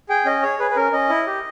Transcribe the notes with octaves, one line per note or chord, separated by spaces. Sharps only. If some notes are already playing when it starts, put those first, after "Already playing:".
G#4 G5
C#4 D#5
G#4 C#5
G#4 B4
B4
C#4 A#4
C#4 D#5
E4
G4